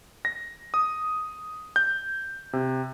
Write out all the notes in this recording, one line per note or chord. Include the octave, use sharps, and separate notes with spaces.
A#6
D#6
G6
C3